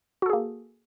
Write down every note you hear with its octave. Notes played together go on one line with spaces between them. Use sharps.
A#3 F#4 G#4 A4